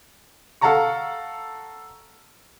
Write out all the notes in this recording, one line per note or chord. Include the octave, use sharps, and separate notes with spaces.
A4 F5 F#5 A5 A#5 C#6